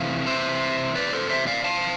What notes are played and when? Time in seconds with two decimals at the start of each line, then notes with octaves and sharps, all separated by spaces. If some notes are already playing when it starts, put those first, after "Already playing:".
Already playing: C3 E3 A3 F5
0.27 C5 E5
0.95 B4 D5
1.13 A4 C5
1.30 C5 E5
1.47 D5 F5
1.64 F5 A5